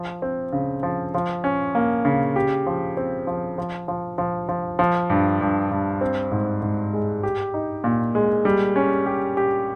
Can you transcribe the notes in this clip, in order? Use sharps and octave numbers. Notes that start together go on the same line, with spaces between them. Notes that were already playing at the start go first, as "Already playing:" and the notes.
Already playing: F3
C4
C#3
F3
F3
C#4
A#3
C#3
G4
F3
C4
F3
F3
F3
F3
F3
F3
G2
G2
G2
C4
G#2
G#2
G#3
G4
D#4
A#2
G#3
G3
C#4
G4
G4